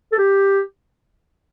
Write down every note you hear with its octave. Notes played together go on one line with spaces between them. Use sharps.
A4
G4